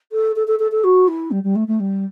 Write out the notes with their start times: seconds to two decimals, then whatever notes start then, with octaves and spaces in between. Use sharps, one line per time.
0.12 A4
0.36 A4
0.47 A4
0.59 A4
0.71 A4
0.84 F#4
1.08 E4
1.31 G3
1.43 G3
1.55 A3
1.67 A3
1.80 G3